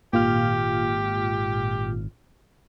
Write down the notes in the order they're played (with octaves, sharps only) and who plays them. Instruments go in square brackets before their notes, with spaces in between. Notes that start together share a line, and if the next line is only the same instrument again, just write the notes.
[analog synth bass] G#1 [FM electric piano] A#2 F4 F6 [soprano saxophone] G4